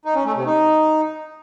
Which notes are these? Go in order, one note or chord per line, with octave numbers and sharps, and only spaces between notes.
D#4
C#4
A3
C3
D#4